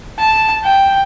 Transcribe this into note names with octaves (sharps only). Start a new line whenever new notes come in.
A5
G5